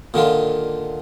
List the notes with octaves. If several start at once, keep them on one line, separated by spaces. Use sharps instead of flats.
A#2 D3 D#3 F4